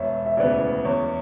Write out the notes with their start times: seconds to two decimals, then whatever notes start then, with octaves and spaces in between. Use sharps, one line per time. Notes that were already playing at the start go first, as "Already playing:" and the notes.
Already playing: E1 C#5 E5
0.26 E5
0.37 D2 C#3 E3 B3 D5
0.85 E2 C#5